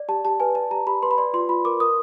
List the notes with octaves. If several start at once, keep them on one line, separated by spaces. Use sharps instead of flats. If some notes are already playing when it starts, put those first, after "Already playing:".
Already playing: D5
G4 A5
G4 A5
B4 G#5
D5 A5
G4 A#5
G4 B5
B4 C6
B5
D5 C6
F4 C6
F4 B5
A#4 D6
A#4 D#6